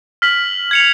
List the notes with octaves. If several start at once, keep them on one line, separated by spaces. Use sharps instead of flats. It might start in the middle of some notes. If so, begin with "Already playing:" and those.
F6 B6 F#7
G#6 C#7 F7